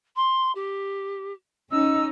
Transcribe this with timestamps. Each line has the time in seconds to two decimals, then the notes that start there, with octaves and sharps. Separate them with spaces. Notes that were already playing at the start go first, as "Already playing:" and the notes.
0.16 C6
0.55 G4
1.71 C#4 D#4 E6